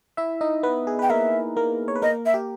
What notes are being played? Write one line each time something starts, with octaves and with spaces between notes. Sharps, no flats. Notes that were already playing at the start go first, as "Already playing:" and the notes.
E4 E5
D#4 D#5
B3 B4
G#4
B4 G5
A#3 A#4 E5
A#3 A#4
C#5
B4
A#3 A#4 D#5
E5
G4